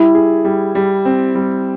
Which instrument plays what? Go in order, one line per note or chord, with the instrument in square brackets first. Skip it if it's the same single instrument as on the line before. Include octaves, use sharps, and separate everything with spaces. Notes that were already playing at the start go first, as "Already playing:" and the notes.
Already playing: [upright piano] G3 [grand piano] E4
[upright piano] G#4
G3
G3
C4
G3